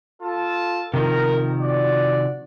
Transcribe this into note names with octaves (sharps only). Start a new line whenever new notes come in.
F4 A4 A5
C3 D#3 F3 A#4
F#4 D5